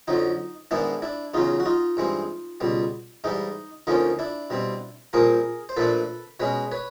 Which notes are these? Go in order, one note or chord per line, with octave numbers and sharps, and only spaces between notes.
F2 D3 F#3 D#4
G#2 D#3 G#3 B3 D4 E4
D4 E4
E2 C#3 F#3 D#4 F4
F#4
D#4 F4
G2 E3 G#3 C4
C#2 B2 G3
G#2 E3 G3 D#4
D2 D3 F3 A#3 C#4 D#4
D4 E4
B2 G3 C4
C2 A#2 F3 A#3 G#4 A#4
C5
A#2 F3 A3 D4 A4 B4
B2 G#3 C#4 B4 C#5
B4 C#5